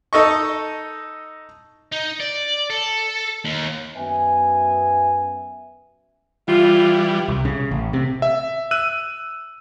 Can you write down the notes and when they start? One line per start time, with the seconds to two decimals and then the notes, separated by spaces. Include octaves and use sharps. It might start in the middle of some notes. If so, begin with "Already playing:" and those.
0.13 D#4 A4 D#5 C#6
1.92 D#4
2.20 D5
2.70 A4
3.45 D#2
3.96 F#2 B3 E5 G#5
6.48 E3 G3 F4
7.29 C2
7.45 C#3
7.71 A1
7.93 C3
8.22 E5
8.71 E6 F#6 D#7